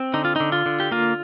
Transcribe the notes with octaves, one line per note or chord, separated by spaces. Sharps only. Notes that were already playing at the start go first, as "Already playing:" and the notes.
Already playing: C4
D3 D#4
F4
D3 D#4
F4
D3
G4
A#3 F4